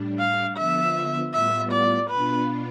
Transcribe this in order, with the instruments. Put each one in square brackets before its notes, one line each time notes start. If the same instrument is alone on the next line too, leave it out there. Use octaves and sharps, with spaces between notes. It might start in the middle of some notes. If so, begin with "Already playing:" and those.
Already playing: [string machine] A2 G3 D4
[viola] F5
[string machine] D3 F3 B3 F4 [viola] E5
[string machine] A2 G3 B3 F4 [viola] E5
[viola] D5
[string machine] B2 B3 D4 F4 [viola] B4